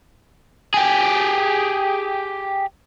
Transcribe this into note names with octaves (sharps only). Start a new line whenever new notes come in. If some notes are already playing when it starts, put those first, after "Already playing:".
G4 G#4